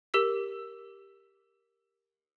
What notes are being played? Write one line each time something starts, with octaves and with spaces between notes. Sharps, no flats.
G4 A#4 E6 B6